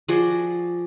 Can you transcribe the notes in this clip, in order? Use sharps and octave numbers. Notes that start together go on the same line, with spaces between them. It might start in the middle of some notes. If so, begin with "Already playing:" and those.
F3 F#4 G#4 D5